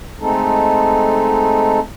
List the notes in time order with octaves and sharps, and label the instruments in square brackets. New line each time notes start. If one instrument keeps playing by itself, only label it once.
[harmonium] G#3 A3 C4 D#4 A4